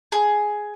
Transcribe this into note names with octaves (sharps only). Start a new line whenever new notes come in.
G#4